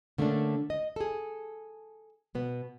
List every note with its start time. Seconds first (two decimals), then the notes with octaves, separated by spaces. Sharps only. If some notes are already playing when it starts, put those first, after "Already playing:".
0.18 D3 A3 A#3 C#4 D4
0.70 D#5
0.96 G#4 A4
2.35 B2 B3